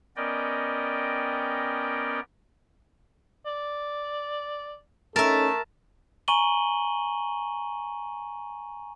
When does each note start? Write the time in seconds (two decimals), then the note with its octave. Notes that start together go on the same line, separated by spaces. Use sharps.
0.16 B3 C#4 A#4 D5 D#5 G5
3.46 D5
5.16 A3 C#4 D#4 A4 A#4 E5 A5
6.28 G#5 A#5 C#6 D#7 F#7 G7